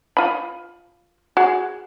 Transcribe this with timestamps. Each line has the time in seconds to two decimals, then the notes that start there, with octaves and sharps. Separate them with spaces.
0.17 F4 B5
1.37 F#4 G#4